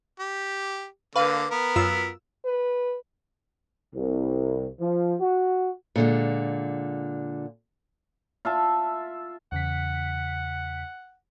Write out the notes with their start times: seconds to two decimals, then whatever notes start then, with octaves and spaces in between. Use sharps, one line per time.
0.20 G4
1.16 D3 A#3 B4 F5 D6
1.51 B3 A#4
1.76 F#2 F4 E6
2.45 B4
3.95 C2
4.80 F3
5.20 F#4
5.96 A#2 D3 G#3
8.45 F4 E5 A5
9.52 E2 C#3 F#5 B6